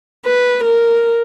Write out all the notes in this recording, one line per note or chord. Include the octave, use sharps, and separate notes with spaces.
B4
A#4